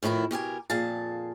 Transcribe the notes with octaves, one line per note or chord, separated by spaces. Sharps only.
F2 A2 D#3 E4 A#4
B2 G4 A#4 G#5
F2 A#2 G#4 F5 A5